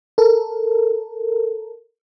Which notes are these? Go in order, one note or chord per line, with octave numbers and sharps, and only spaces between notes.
A4 A#4